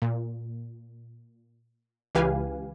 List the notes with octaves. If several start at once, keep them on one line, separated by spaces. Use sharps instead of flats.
A#2
C#2 E3 G4 B4 F5 G#5